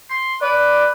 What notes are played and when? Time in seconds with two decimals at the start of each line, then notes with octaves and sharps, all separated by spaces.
0.10 C6
0.42 B4 D5